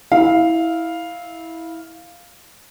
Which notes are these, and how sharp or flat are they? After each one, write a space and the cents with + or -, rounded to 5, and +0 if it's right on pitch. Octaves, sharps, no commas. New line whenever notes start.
E4 -15 F5 +0